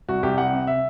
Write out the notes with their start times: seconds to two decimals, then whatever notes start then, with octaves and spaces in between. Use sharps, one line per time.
0.09 C2 F#4
0.23 C2 G4
0.38 G3 F#5
0.53 C3
0.67 E5